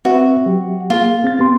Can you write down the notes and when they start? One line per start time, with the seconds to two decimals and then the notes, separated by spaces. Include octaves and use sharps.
0.05 C4 F#4 B4 E5
0.46 F#3 G4
0.90 A#3 F4 G#4
1.24 C4 A6
1.39 B3 G4 C6